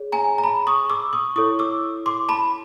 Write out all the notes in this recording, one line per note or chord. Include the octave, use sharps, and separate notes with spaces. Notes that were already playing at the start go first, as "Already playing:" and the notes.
Already playing: G#4 C#5
G#5 A#5
A#5
A5 B5
C#6 D#6
D6 E6
C#6 D#6
E4 A4 C#5 C#6 D#6
D6 E6
C6 D6
A5 B5